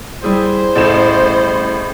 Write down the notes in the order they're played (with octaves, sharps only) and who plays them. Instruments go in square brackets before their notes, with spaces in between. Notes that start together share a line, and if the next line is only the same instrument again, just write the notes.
[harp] G3 E4 G#4 [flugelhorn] C5
[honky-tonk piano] A1 A2 E7